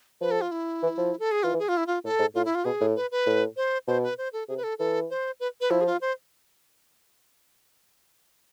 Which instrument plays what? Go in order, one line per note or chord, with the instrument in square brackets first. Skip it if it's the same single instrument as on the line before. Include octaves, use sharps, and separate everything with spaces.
[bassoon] F3 [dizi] B4
[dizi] A4
F4
E4
[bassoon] E3
F3
[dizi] A4
G#4
[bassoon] E3 [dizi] F4
[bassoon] E3
[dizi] G#4
F4
E4
F4
[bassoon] A2 [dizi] A4
[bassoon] G#2
[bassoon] A2 [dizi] F4
[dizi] E4
F4
[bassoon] B2 [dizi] G#4
[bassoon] A2
[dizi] B4
B4
[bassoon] A2
[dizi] C5
[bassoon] B2 [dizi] C5
[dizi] B4
C5
A4
[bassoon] C3 [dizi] G#4
[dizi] B4
A4
[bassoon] E3 [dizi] A4
[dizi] C5
B4
B4
[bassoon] F3 [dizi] E4
[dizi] G#4
F4
C5